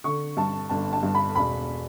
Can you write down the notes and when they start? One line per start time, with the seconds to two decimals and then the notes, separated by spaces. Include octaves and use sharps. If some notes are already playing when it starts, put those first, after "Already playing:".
0.04 D3 C#6
0.37 G2 A5
0.69 G1 A5
0.93 A5
1.03 G2
1.15 B5
1.35 E1 B5